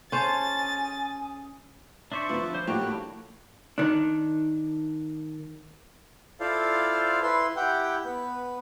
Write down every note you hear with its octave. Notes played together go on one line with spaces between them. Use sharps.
C#4 G#4 C5 F5 G#5 A5 D#6 A6
D4 C5 D5 E5 C#6
D1 F4 B4
F3
C5
A2 F3 G3 A#3 D4 F#4 G4
A2 E4
D#3 D4
E4 F4 A4 C5 D5 F5
E4 B4 C6
E4 G4 F#5 G5
B3 B4